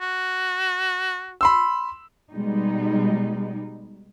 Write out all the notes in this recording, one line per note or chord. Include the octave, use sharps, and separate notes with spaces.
F#4
B5 C6 E6
B2 G3 G#3 D#4